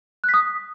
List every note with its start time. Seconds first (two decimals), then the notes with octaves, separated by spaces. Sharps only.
0.24 F#6
0.29 B6
0.34 D#6